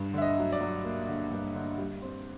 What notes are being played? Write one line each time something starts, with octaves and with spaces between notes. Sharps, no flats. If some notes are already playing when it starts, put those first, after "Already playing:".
Already playing: G2
D3 E5
D#5
F#3
D5
F#3
A#3
D3
G2
D3
G3
C4